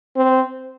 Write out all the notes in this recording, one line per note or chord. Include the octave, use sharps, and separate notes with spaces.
C4